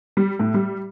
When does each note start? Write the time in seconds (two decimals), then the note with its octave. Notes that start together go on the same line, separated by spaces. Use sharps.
0.17 G3
0.39 A2
0.54 G3